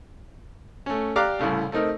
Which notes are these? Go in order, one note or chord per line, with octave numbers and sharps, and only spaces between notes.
A3 C#4
G4 D5 F5 A#5 D6 F#6
C2 A2 C#3 A3
A3 C4 D#4 A#4